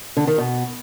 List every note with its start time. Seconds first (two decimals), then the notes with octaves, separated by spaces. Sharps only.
0.17 D3
0.27 D#3
0.38 B2